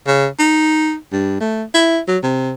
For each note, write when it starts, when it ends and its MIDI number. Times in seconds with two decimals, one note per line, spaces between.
0.07 0.27 49
0.39 0.95 63
1.12 1.38 43
1.40 1.64 57
1.74 2.00 64
2.08 2.18 54
2.23 2.54 48